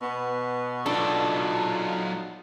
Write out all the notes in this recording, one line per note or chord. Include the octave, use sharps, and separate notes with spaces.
B2 B3
F#3 B3 D4 D#4 F4 A4